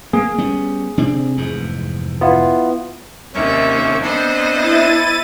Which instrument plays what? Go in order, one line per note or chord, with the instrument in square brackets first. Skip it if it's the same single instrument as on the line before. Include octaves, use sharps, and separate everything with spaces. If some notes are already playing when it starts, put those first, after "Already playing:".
[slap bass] A#3 [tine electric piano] G#4
[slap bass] G3 B3 C#4
C3 C4 D4
F1 E2 G#2
[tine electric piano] B3 E4 F4
[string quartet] D#2 E5 [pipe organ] C3 A#3 C#4
[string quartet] B3 C5 D#5 [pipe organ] C4 D4
[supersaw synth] E4 A6 D#7